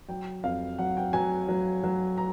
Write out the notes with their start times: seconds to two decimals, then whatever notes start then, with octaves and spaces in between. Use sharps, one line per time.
0.09 F#3 G5
0.44 F2 F5
0.78 F#3 F#5
0.97 G5
1.13 F#3 G#5
1.49 F#3
1.84 F#3
2.18 A#5